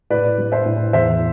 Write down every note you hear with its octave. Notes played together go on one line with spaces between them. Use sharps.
A2 B4 D5
G3
C5 E5
A2
E2 C5 E5